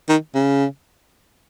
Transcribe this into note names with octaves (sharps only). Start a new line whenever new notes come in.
D#3
C#3